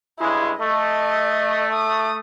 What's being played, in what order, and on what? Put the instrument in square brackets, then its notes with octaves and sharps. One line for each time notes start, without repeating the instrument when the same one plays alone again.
[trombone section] G2 C#3 G#3 [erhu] E4
[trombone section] A3 [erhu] D#5
[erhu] D#6